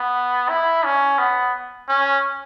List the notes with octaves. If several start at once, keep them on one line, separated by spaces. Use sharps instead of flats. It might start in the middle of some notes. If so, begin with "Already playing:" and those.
Already playing: B3
E4
C#4
B3
C#4